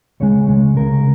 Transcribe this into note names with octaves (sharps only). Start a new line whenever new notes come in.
C#2 C#3 G#3 C#5
C#2 C#3 G#3
C#2 C#3 G#3 A#4